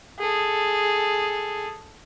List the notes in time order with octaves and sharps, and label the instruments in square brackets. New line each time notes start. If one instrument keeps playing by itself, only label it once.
[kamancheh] G#4 A4